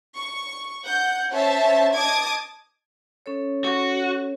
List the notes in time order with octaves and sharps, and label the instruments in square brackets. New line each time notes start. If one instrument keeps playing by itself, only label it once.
[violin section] C#6
F#5 G6
C#4 C5 C#5 E5 A5
D#5 A5 D6 D#6 G#6
[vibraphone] C#4 A4 C#5
[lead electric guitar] F#4